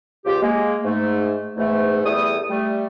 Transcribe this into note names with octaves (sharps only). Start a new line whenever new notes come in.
C#2 F4 G4
G#3 A#3
G#2 A3
E2 G#2 A3
E2 G3 A3 E5 D#6
G3 A3